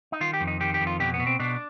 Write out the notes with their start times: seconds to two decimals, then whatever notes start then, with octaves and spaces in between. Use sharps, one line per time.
0.12 D#4
0.21 D#3 F4
0.33 G4
0.41 F2
0.47 D#4
0.61 D#3 G4
0.74 G4
0.81 F2
0.87 F4
1.00 B2 G4
1.14 B3
1.20 B2
1.27 C4
1.40 B2 D4